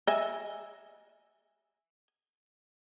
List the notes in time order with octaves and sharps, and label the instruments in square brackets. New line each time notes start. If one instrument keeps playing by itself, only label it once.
[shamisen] D#5 E5 G#5